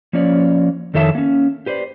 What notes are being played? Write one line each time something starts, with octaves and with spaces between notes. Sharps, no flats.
F3 A#3 C#4 C#5 D5
F2 D#3 A4 C#5 E5 A5
A#3 C#4
G4 B4 C5 D5